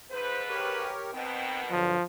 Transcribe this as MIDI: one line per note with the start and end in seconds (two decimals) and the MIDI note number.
0.11 0.93 44
0.11 0.93 71
0.11 0.43 72
0.49 1.11 67
0.49 1.11 70
0.49 1.11 73
1.13 1.76 47
1.13 1.76 51
1.13 1.76 59
1.13 1.62 60
1.13 1.62 79
1.71 1.97 43
1.71 1.97 50
1.71 2.03 53
1.71 1.97 54